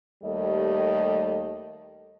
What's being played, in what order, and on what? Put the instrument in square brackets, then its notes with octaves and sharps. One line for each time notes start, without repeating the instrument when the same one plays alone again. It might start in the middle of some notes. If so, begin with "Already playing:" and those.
[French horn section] D#2 G3 A3 G4 A4 D#5